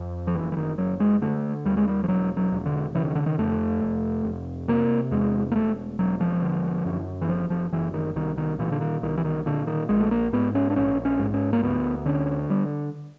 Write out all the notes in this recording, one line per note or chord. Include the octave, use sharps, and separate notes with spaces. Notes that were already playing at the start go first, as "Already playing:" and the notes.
Already playing: F2
F3
F#1 E3
E3
D#3
F#1 F#3
G#3
D3 A3
D#2 G3
G#3
G3
F3
E1 F#3
F#3
E1
D3
C#3 E3
D#3
D3
D#3
F2 A3
F1
F1
C3 A#3
E2 G#3
A#3
E1 A3
E1 F#3
F3
D3
F#2
E3
F#1 F3
F3
F#1 E3
D#3
C2 D#3
D#3
A#2 E3
D3
D#3
C2 D#3
E3
D#3
A#2 D3
D#3
A#1 G#3
A3
A#3
G#2 B3
C#4
D4
A#1 C#4
C#4
G#2
C#4
A#3
D2 B3
D3 C#4
G3